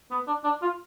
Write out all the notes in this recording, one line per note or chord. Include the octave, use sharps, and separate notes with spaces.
B3
D4
D4
F4